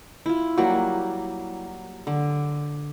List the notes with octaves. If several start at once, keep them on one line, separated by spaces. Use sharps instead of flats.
E4 F4
F#3 G3 A#3 F#4
D3